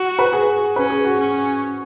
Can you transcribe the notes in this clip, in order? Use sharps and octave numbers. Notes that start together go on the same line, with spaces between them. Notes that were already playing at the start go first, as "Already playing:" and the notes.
Already playing: F#4
B4
G#4
C#4 B4
G#4
F#4
C#4